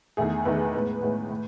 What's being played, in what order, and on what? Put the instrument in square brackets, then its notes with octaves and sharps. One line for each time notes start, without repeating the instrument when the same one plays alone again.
[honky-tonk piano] E2 D#3 A3 G#4
E2 D#3 A3 B4
A2 G#3 B3
A2 G#3 B3
A2